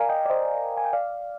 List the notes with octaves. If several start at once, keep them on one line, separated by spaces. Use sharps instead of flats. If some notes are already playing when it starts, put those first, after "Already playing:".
Already playing: A#4 D5 F5 G#5 A#5
D#5 G5
D5
C5 D#5
G#5
G5
D5 F5